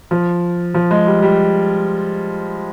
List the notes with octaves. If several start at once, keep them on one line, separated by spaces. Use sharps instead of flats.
F3
F3
G#3
G3
G3